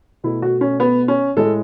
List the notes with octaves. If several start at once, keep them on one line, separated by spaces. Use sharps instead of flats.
B2 A3 E4
F#4
C#4
B3
C#4
A2 G#3 A4